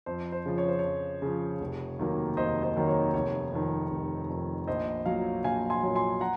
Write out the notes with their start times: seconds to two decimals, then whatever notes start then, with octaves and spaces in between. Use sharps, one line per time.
0.06 F2 C5
0.32 C5
0.45 C#3 F3
0.58 C#5
0.68 C5
0.79 F2 C#5
1.22 C#3 F3
1.60 F1
1.99 D#2 D#3 F#3 A#3
2.37 F1 C5 D#5
2.63 C5 D#5
2.76 D#2 D#3 F#3 A#3
2.88 C#5
3.14 F1 C#5
3.52 F2 D#3
3.90 F1
4.29 F2 D#3
4.68 A#1 C5 D#5
5.06 A#2 F#3 C#5 F5
5.44 A#1 F5 G#5
5.70 G#5 C6
5.83 A#2 F#3
5.96 G#5 C6
6.21 F#5 A#5